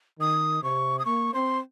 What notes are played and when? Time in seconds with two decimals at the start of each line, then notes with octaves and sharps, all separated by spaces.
0.20 D#3 D#6
0.63 C3 C#6
0.99 D#6
1.05 A#3 C#6
1.34 C4 C6